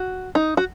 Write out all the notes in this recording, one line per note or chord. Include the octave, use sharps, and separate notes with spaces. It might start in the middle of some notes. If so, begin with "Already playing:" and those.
Already playing: F#4
D#4
F#4